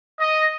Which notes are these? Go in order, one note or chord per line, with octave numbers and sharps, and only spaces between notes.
D#5